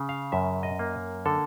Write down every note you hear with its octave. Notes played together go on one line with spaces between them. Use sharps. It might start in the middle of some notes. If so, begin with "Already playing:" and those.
Already playing: C#3
F5
F#2 E5
D#5
A#3
D3 A4